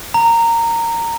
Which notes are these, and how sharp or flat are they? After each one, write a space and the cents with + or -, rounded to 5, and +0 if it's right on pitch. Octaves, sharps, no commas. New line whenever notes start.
A#5 -15